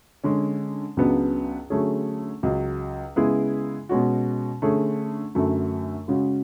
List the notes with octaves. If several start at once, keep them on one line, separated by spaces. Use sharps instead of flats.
D3 G#3 C#4
C#2 C#3 F#3 B3 D4
D3 F#3 A3 C#4 G#4
C#2 C#3 F#3
C#3 G#3 B3 E4 G#4
B2 G#3 C#4 F#4
D3 A3 C#4 G#4
F#2 D3 F#3 A3
C#3 G#3 C#4 F#4